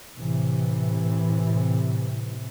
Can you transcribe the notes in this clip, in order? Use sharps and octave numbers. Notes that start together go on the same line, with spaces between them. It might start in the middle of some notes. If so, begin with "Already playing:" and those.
A2 C3 E3